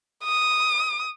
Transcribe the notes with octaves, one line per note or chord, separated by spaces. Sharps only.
D#6